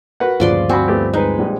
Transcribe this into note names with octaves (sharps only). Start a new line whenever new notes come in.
F#4 A#4 B4 F#5
D2 G2 A#2 C#3 F3 G3 D5 C6
C4 F#4 C5 G#5 B5
A3 B3 G4
G#3 D#4 B4
A#1 G3